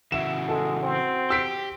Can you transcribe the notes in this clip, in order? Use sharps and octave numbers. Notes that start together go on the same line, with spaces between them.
C#3 E3 F#4 E5 E7
G#3 A4
C4
G4 E6 B6 D7